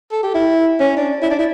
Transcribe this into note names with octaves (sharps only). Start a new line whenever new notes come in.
A4
G4
E4
C#4
D4
E4
D4
E4